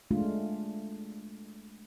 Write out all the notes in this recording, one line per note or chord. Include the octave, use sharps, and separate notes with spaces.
G#3 A3 D4 F4